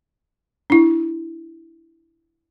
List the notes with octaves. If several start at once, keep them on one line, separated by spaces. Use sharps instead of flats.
D4 E4